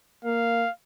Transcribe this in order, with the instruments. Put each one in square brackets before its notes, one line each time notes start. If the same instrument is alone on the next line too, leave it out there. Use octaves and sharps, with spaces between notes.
[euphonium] A#3 [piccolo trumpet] F5